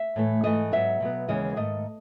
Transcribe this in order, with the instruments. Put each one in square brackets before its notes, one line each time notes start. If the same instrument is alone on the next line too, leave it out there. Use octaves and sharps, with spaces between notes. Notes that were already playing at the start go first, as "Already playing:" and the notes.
Already playing: [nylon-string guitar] E5
A2 E3 A3
G#2 E3 A3 D#5
G#2 F#3 B3 E5
B2 F#3 B3
D#2 C#3 E3 G#3 B3 D#5
G#2 D#3 A3 D#5